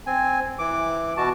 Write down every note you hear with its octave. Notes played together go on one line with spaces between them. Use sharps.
C4 G#5
E3 D6
B2 F#4 A5